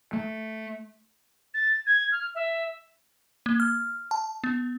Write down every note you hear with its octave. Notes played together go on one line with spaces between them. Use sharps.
A3
A6
G#6
F6
E5
A#3
F6
A5
B3